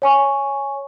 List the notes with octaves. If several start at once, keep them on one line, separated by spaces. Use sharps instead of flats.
C#5 G#5 C#6